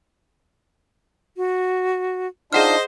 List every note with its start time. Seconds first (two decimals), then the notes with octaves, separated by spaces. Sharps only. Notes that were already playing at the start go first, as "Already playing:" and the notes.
1.37 F#4
2.53 D4 D#4 F4 G#4 C5 D#5 F#5 F6